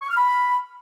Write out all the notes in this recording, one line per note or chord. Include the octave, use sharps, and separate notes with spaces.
C#6
F6
B5